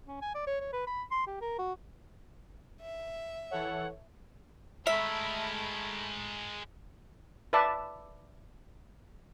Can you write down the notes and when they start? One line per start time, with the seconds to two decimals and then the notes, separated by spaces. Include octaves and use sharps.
0.08 C#4
0.21 G#5
0.35 D5
0.47 C#5
0.61 C#5
0.73 B4
0.87 B5
1.11 C6
1.27 G4
1.41 A#4
1.59 F#4
2.81 E5
3.51 E3 A4 C#5 F#5
4.87 G#3 A3 A#4 E5 B5
7.53 B4 D5 E5 A5